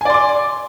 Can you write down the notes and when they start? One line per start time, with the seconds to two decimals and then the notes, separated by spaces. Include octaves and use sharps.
0.01 G#5
0.05 D5
0.10 C6
0.14 D6